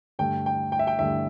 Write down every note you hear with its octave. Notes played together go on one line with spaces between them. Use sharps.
G2 D3 A3 G5
G5
G5
E5
G5
G2 D3 A3 E5